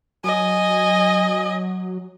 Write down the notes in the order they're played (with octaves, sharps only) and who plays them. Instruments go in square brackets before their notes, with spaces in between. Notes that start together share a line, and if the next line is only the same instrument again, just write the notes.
[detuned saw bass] F#3 [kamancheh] D#5 G#5